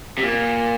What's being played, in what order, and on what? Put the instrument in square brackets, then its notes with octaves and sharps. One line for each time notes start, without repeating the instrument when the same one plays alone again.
[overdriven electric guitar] C3
A#2